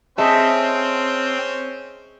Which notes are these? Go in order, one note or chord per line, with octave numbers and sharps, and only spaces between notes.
C4 C#4 G#4 A4 C5 D#5 E5